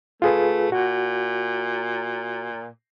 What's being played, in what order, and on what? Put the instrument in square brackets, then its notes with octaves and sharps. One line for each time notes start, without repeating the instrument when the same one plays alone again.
[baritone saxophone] A3 [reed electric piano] F4 G#4 B4
[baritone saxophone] A#2 [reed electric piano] F#4